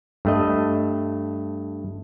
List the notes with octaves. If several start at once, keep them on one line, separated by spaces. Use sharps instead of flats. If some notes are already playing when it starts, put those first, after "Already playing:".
G2 A3 D#5